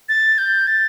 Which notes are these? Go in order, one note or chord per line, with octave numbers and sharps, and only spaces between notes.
A6
G6
A6